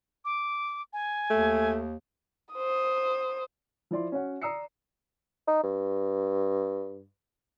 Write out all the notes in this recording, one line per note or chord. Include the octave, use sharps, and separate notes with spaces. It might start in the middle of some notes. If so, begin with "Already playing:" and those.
D6
G#5
D#2 A3
C5 D#6
F3 E4 D5 C6
C#4 F#4 C#5 F#5
D5 A#5 D#6 E6 C7 C#7
D#4
G2